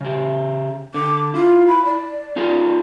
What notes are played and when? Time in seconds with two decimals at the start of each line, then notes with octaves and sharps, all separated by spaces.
0.01 C#3 G4
0.94 D3 D6
1.34 E4 F4
1.67 B5
1.85 D5
2.36 D#4 F4 G#4